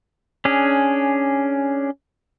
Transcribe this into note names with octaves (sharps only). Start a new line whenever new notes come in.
C#4 D4 G#4